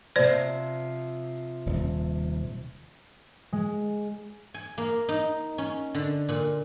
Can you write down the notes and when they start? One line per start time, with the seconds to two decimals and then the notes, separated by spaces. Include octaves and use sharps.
0.16 C3 F3 C5 D5
1.66 D#1
3.53 G#3
4.54 G#5
4.78 A#3
5.09 D#4
5.58 C#4
5.95 D3
6.29 A#2